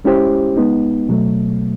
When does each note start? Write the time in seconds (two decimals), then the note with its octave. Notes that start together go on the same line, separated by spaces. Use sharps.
0.04 G#3 C#4 E4 G4 C5
0.57 G#3 B3 D#4
1.09 B2 F#3 A3